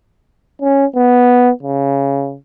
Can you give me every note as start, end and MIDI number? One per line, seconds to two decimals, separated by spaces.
0.61 0.85 61
0.96 1.51 59
1.63 2.36 49